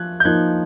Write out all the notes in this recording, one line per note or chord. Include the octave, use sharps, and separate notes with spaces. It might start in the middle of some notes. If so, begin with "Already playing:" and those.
Already playing: F3 F#6 G#6
G6
F3 A#3 D#4 F#6 G#6